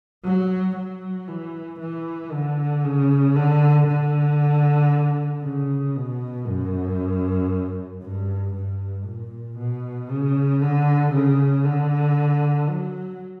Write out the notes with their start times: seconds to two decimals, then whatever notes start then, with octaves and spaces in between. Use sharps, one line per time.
0.25 F#3
0.76 F#3
1.28 E3
1.80 E3
2.32 D3
2.84 C#3
3.36 D3
3.87 D3
5.43 C#3
5.96 B2
6.46 F#2
8.03 G2
8.55 G2
9.06 A#2
9.58 B2
10.10 C#3
10.62 D3
11.13 C#3
11.65 D3
12.69 F#3